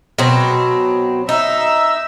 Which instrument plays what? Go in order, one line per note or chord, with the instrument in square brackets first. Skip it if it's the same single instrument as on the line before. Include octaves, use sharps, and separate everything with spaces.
[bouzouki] B2 F#3 C4
[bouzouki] D#4 [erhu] E5